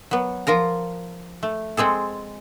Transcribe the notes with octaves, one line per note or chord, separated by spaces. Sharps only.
F#3 B3
F3 F4 A#4 A#5
A3
G#3 C4 G#4 A4